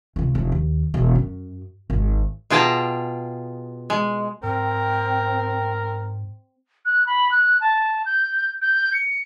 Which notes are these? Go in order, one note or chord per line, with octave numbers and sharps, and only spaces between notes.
C#2 C3
F1
D#2
E1 G#3
F#2
G#1
B2 F4 G#4 G5 A5 A#5
G#3
G#2 C4 A#4 G5
F#6
B5
F#6
A5
G6
G6
C#7